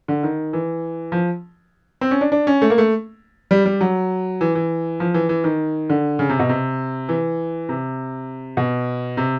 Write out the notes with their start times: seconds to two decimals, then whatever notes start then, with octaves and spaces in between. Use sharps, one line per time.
0.08 D3
0.23 D#3
0.53 E3
1.12 F3
2.01 C4
2.11 C#4
2.21 D4
2.32 D4
2.47 C#4
2.62 A3
2.70 A#3
2.78 A3
3.51 G3
3.66 G3
3.81 F#3
4.41 E3
4.55 E3
5.00 F3
5.14 E3
5.29 E3
5.44 D#3
5.90 D3
6.19 C#3
6.29 C3
6.40 B2
6.49 C3
7.09 E3
7.69 C3
8.57 B2
9.17 C3